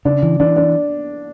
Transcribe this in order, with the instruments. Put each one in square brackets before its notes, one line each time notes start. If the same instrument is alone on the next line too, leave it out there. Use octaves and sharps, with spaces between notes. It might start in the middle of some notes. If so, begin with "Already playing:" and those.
[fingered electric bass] C#3 [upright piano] D4
[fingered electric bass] E3
[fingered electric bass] E3 [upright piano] D4
[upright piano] D4